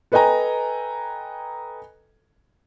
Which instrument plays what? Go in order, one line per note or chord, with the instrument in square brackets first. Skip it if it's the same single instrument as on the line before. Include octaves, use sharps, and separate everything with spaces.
[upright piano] A4 B4 D#5 G5 G#5 A#5